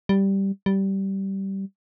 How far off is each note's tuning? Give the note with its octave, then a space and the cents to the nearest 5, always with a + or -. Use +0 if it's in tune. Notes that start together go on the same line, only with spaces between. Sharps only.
G3 -5
G3 -15